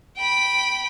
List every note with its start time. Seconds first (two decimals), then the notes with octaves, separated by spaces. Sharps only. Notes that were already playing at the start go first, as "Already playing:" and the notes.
0.16 G5 B5